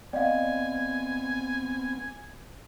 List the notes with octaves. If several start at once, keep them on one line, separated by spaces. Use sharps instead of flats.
B3 C4 D5 D#5 F5 G#5